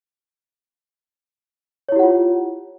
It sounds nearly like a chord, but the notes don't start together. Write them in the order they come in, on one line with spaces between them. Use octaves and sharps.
C#5 E4 G4 F#5 F4